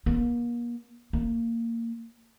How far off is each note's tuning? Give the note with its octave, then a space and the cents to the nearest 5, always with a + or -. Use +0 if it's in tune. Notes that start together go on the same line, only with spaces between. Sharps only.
A#3 +40
A#3 -20